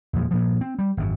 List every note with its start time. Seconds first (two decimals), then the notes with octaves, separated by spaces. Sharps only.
0.13 E2 A#2 F3 G#3
0.31 G2 A#2 F3
0.61 C4
0.79 G3
0.97 G#1 F#2